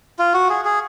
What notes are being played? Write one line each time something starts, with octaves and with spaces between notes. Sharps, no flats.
F4
F#4
G#4
G#4